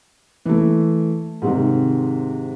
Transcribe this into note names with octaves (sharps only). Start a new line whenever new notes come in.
E3 A3
G#2 C3 D#3